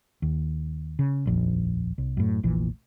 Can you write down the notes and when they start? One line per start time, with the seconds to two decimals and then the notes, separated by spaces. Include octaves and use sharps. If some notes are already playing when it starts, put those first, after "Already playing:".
0.22 D#2
0.99 C#3
1.26 D#1 A#1 F2
1.98 C2
2.17 F#2 A2
2.43 F1 A#1 A#2 E3